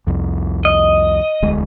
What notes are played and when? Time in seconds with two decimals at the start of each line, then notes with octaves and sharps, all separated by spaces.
0.07 C2 F2
0.65 D#5
1.42 E1 D2 G#3